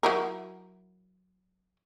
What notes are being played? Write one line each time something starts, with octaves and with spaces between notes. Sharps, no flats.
F#3 E4 A#4